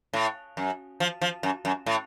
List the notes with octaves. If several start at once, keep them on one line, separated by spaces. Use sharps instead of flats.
A2
F#2
F3
F3
F#2
F#2
A2